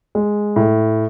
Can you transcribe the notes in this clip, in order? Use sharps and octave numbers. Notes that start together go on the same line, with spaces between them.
G#3
A2